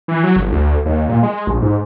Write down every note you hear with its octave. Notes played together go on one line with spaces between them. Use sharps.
E3
F#3
G1
D2
D#2
A#2
G#3
A#1
G#2